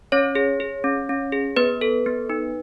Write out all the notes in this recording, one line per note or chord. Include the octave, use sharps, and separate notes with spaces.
C#4 C#5
G#4
G#4
C#4
C#4
G#4
B3 B4
A4
B3
D#4